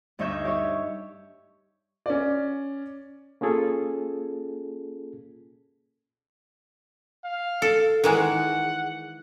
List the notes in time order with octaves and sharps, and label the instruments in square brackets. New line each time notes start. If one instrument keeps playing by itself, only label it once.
[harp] D2 G2 D#4 C#5 E5 G6
G4 C#5
[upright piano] C#4 D5
[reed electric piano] A#3 C#4 F4 G#4 A4
[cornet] F5
[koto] A4
[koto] D#3 E3 G#3 [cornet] F#5